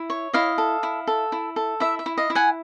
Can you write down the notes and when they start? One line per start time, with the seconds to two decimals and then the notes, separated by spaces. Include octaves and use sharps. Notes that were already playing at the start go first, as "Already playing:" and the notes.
Already playing: E4
0.10 C#5
0.33 E4 D#5 F5
0.58 A4
0.83 E4
1.07 A4
1.32 E4
1.56 A4
1.80 E4 E5
1.99 E5
2.06 E4
2.17 D#5 F5
2.30 E4
2.35 F#5 G#5